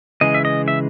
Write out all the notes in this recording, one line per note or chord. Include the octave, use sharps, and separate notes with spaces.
C#3 E3 G#3 D#5
E5
D#5
E5